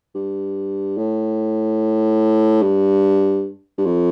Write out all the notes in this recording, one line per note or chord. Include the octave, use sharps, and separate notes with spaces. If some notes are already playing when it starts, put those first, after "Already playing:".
G2
A2
G2
G2
F2